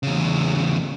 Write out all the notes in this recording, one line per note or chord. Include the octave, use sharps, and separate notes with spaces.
E2 C#3